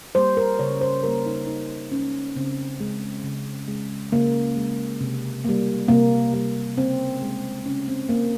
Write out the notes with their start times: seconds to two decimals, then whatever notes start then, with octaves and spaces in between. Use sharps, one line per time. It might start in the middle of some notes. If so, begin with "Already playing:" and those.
0.15 G3 A#3 C5
0.37 A#4
0.59 C#3 C#5
0.81 C5
1.03 G3 A#3 A#4
1.26 D#4
1.47 C#3 D#4
1.92 G#3 C#4
2.36 C#3 C4
2.80 G#3
3.24 C#3
3.68 G#3
4.12 C#3 A#3
4.56 G#3
5.01 C3
5.45 G3 A#3
5.88 C3 A#3
6.33 G3 A#3
6.77 C#3 C4
7.22 G#3
7.65 C#3 C#4
7.88 C4
8.09 G#3 A#3